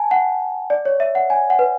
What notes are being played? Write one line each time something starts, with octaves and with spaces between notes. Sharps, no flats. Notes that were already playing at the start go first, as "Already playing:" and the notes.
Already playing: G#5 A5
F#5
D5
C#5
E5
F#5
G#5
F#5
B4